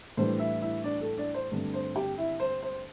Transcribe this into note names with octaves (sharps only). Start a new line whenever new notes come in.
A2 E3 G3 D4 C5
E4 E5
E4 E5
D4 D5
A4
D4 D5
C5
G2 D3 A3 C4
C5
G4 G5
E4 E5
C5
C5